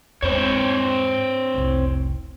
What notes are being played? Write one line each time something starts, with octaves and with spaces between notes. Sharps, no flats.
E2 G#2 C4 C5 C#5
F1 C2